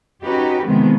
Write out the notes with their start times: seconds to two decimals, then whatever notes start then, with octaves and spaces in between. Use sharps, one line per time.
0.25 C#4 D#4 F#4 G4 B4
0.66 C3 D#3 F3 G#3 B3 C4